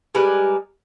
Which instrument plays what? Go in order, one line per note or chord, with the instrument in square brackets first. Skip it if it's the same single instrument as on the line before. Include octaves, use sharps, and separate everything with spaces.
[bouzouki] G3 G#3 A#4 B4